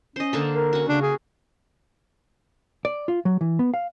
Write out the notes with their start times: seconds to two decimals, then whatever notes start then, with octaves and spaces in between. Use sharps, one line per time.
0.16 C#4 C5 D#5
0.33 D3 A#3 A4
0.55 A#4
0.73 C#4 F#4
0.88 C#3 D4
1.02 G#4
2.85 D5
3.08 F4
3.25 F#3
3.41 E3
3.59 B3
3.74 F5